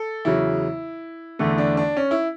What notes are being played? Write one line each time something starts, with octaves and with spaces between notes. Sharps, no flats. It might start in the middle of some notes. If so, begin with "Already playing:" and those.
Already playing: A4
E2 C#3 F#3 E4
E2 D3 A3
D4
D4
C#4
E4